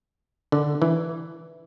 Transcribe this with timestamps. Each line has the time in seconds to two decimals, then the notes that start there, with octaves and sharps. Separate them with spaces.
0.52 D3
0.82 E3